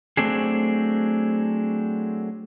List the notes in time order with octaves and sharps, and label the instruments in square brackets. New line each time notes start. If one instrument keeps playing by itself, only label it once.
[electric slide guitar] F#3 A3 C4 D4 G#4